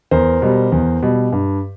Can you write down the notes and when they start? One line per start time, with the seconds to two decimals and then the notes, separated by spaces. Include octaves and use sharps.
0.11 E2 A#4 C5
0.42 B2 G3
0.72 E2
1.03 B2 G3
1.32 G2